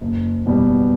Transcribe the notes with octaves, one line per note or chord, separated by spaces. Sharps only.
F#1
E2 B2 G3